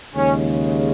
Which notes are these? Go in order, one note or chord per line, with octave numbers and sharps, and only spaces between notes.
D#2 C#3 G#3 C#4